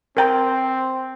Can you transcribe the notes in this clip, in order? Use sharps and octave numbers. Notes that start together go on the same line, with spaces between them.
C4 A#4 G5 A#5